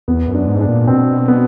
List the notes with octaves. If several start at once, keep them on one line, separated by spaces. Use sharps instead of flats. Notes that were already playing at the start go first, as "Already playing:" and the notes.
E2 B3
F#2
D4
G#2
D4
A#2
B2 C4
B3